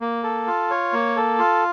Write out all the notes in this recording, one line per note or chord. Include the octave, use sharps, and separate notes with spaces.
A#3
A4
F4
C#5
A#3
A4
F4